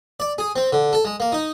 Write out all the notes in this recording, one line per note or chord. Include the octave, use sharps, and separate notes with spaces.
D5
G#4
C4
D3
A4
G#3
A#3
D#4